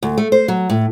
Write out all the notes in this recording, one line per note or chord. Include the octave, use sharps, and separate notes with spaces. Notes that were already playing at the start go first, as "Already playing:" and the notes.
D2
A3
C5
F#3
A2